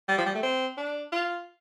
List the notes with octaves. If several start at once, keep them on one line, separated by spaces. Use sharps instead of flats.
G3
F3
G3
A3
C4
D4
F4